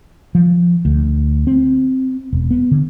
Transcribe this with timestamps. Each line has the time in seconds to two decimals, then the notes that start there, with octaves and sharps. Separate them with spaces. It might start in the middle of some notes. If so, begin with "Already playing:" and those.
0.35 F3
0.85 D2
1.47 C4
2.33 E1
2.51 B3
2.71 D3